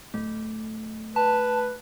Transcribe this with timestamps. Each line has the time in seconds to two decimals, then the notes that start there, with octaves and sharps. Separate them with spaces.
0.14 D1 A3
1.16 B4 A5